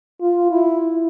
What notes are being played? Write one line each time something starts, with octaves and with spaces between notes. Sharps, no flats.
F4
E4